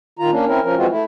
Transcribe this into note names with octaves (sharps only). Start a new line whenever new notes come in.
D#3 F4 A#5
A#3 C#4 D4
C4 C#4 E4 A#4
F3 C#4 A#4
E3 F3 G#3 C4 F4 F#4
A3 E4